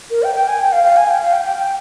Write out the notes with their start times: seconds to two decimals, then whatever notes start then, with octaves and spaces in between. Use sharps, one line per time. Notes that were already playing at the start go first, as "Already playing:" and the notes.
0.11 A#4
0.23 G5
0.35 G5
0.48 G#5
0.60 G5
0.72 F5
0.85 F5
0.97 G#5
1.09 G5
1.21 F5
1.33 G5
1.45 G5
1.57 G5